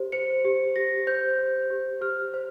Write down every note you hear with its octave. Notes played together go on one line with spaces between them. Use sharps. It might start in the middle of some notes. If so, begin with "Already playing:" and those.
Already playing: G4 C5
C5 C#7
G4
G4 A#6
C5 G6
C5
G4
G4 F6
C5